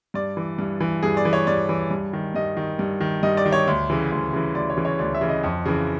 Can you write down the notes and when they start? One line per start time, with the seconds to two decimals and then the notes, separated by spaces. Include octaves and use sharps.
0.14 G2 D5
0.37 E3
0.59 G2
0.80 E3
1.03 G2 G#4
1.17 D5
1.25 E3
1.33 C#5
1.47 G2 D5
1.69 E3
1.91 G2
2.13 D#3
2.35 G2 D#5
2.57 D#3
2.79 G2
3.00 D#3
3.23 G2 D#5
3.37 D5
3.45 D#3
3.52 C#5
3.67 D2
3.90 C#3 E3
4.12 D2
4.33 C#3 E3
4.55 D2 D5
4.70 C#5
4.77 C#3 E3
4.85 C#5
4.99 D2 D5
5.14 E5
5.21 C#3 E3
5.29 D#5
5.43 F2
5.65 C#3 E3